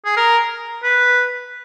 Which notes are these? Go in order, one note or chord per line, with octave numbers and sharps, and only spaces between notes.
G#4
A#4
B4